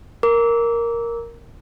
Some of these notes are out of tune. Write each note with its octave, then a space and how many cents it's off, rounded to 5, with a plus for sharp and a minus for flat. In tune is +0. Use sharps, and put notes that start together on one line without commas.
A#4 +0 D6 -25